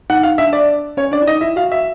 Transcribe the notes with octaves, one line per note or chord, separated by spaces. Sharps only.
D#4 F#5
F5
D4 E5
D5
C#4 C#5
D4 D5
E4
D#4 D#5
E4 E5
F#4 F5
E5